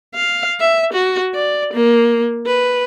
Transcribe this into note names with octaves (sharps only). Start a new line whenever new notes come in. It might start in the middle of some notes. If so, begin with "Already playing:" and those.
F5
E5
F#4
D5
A#3
B4